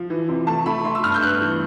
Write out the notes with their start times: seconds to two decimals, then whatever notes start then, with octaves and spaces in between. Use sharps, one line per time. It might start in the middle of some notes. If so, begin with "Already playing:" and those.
Already playing: F3
0.10 E3
0.29 C3
0.47 A3 A5
0.66 A3 B5
0.85 A3 C6
0.95 E6
1.04 G2 F6
1.14 G6
1.22 B3 F#6
1.41 E3